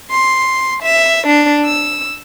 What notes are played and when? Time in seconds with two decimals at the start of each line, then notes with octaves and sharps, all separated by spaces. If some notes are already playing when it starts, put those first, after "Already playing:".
0.10 C6
0.81 E5
1.25 D4
1.64 E6